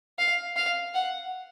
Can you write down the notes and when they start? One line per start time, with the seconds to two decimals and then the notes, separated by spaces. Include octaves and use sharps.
0.19 F5
0.56 F5
0.94 F#5